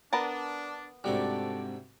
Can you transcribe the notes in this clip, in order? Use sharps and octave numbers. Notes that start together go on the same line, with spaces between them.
B3 D4 A#4 A5
G#2 C3 G3 A3 D4 F#4 A4 D5